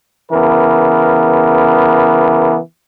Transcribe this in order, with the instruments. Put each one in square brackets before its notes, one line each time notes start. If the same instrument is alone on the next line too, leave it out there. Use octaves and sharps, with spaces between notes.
[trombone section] C#3 E3 B3 A#4